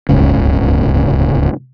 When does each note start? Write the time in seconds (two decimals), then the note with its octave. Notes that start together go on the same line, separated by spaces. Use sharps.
0.09 D1 G1 C#2 C#3